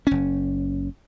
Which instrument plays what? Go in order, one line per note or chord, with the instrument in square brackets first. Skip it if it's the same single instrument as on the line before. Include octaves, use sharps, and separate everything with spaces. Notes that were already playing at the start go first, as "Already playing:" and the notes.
[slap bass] F#1 C#4